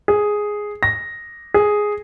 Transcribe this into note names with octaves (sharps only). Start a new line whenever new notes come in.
G#4
A#6
G#4